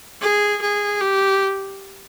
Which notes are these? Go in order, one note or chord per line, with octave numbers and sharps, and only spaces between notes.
G#4
G#4
G4